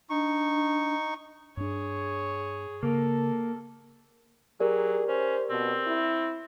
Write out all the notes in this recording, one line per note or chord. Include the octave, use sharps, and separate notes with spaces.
D4 D#4 C#6
G2 D4 G#4 C#5
C#3 A#3 A4
F#3 G4 G#4 A#4 D5
C#4 C5
B2 C4
E4